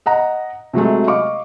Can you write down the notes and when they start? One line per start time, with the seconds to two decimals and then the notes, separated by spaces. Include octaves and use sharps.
0.06 D#5 F#5 A#5
0.73 C3 F#3 G#3 A3
1.07 D#5 F5 C#6 D6